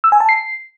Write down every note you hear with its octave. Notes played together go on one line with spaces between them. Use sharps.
E6
G#5
A5
C7